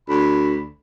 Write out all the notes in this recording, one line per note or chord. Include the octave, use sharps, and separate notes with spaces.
D2 B5